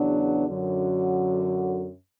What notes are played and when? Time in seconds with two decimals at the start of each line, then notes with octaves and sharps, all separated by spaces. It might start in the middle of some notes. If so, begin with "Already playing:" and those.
Already playing: E2 C#3 F#3 B3 D4
0.48 F#2 D3 F#3